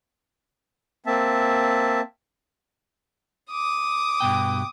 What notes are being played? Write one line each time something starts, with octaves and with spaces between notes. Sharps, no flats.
A#3 C4 E5 A5
D6 D#6
G2 B2 G5